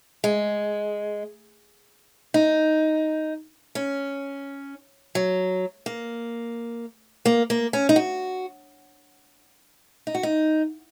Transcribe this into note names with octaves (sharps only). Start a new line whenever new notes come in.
G#3
D#4
C#4
F#3
A#3
A#3
A#3
C#4
D#4
F#4
D#4
F#4
D#4